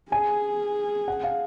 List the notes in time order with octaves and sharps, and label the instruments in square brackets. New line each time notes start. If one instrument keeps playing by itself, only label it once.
[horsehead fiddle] G#4 [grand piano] G#5
[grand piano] F#5
F5